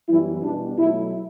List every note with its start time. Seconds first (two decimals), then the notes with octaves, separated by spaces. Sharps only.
0.09 F#2 E3 G3 B3 E4
0.43 B2 G3 B3 D4
0.78 B2 F#3 A3 E4